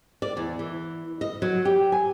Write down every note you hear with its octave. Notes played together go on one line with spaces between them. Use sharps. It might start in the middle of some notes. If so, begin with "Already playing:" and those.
D5
E2
E3
D#5
F#3
G4
G#5